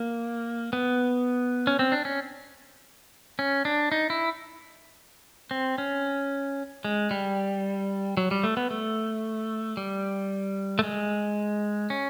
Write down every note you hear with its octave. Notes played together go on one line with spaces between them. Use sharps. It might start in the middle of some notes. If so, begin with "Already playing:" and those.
Already playing: A#3
B3
C#4
C4
D4
C#4
C#4
D4
D#4
E4
C4
C#4
G#3
G3
F#3
G3
A3
B3
A3
G3
A3
G#3
C#4